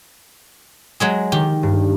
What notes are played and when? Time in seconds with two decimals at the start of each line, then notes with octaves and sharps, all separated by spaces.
1.00 F#3 G#3 G#4
1.32 D#3 G4
1.63 G2